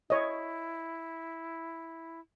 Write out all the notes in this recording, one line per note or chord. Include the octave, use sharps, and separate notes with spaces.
E4 C#5 D#5